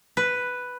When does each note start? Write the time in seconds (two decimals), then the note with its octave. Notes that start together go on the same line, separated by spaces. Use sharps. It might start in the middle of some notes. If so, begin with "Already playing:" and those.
0.17 B4